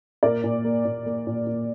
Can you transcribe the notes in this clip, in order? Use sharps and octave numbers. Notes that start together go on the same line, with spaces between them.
A#2 A#4 D5
A#2
A#3
A#2
A#3
A#2
A#2